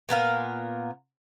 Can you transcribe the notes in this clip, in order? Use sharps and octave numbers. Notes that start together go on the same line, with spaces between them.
A#2 B3 A#4 F5